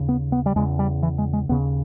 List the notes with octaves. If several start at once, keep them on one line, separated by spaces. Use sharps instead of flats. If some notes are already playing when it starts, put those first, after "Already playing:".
Already playing: D#2 C#3
B3
B3
G3
E2 C#3 G#3
G3
E3
G#3
G#3
D#2 C#3 B3